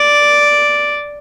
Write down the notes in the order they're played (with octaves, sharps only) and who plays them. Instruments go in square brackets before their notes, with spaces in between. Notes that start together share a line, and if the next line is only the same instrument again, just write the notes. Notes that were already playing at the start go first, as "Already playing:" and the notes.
Already playing: [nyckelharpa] D5